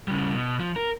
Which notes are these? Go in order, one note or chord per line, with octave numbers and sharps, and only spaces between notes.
C#3 G3
B2
F3
A#4